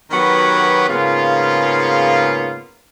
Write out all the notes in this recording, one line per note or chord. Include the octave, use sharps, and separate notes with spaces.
D#3 F#3 B3 F#4 G4 B4
G#2 C#3 A#3 B3 F4